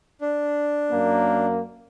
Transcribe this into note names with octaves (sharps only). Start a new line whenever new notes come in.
D4
F#2 A#3